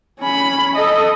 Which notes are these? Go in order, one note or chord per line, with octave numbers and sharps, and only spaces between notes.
C#4 B5
A4 D#5